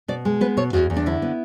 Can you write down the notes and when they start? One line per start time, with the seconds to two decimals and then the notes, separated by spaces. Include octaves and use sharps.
0.08 B2 D5
0.25 G#3
0.41 B3 B4
0.57 B2 C#5
0.73 E2 F#4
0.90 E2
0.96 D4
1.06 D3 E4
1.22 B3